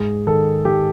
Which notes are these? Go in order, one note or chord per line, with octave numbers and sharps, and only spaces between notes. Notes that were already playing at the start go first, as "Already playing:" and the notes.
Already playing: G#2 G#4
D#3 A4
D#3 G4